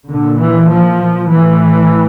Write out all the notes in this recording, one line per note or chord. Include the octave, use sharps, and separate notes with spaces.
A#2 D3
E3
F3
A2 E3